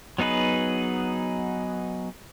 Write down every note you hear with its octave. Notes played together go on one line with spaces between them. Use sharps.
F#3 B3 D#4 G#4 B4